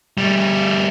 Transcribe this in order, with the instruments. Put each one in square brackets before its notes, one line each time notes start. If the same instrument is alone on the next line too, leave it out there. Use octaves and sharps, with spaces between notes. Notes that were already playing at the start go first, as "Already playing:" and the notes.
[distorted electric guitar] G3 A3